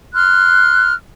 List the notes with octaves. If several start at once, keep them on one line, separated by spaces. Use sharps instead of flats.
C6 F6 F#6